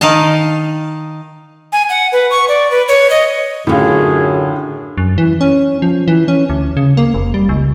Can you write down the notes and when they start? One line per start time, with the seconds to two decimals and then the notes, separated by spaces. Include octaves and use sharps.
0.01 D#3 D#4 F5 A5
1.72 G#5
1.89 F#5
2.12 B4
2.31 C#6
2.48 D5
2.71 B4
2.88 C#5
3.10 D#5
3.67 F#2 A2 D3 C#4 F4 G#4
4.98 F#2
5.18 E3
5.41 C#4
5.82 F3
6.08 E3
6.28 C#4
6.50 D2
6.77 C#3
6.97 A#3
7.14 F1
7.34 G3
7.49 C#2